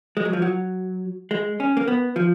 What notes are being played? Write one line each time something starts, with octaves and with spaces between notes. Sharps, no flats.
G#3
F#3
F3
F#3
G#3
C#4
A#3
B3
F3